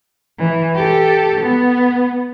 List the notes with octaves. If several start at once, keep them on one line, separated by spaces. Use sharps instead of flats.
E3
G4 A4
B3